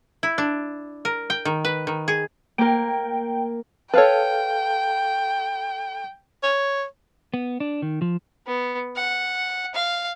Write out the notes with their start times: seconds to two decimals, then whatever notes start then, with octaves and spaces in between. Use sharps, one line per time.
0.23 E4
0.38 D4
1.05 A#4
1.30 G5
1.45 D#3
1.65 B4
1.87 D#3
2.08 G#4
2.58 A#3 A#4 G5
3.94 A4 B4 C#5 F5 G5 A5
6.43 C#5
7.34 B3
7.60 D4
7.82 D#3
8.02 F3
8.46 B3
8.96 F#5
9.75 F5